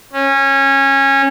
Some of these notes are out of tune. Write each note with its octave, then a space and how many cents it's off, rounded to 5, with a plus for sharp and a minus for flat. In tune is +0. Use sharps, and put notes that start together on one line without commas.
C#4 -20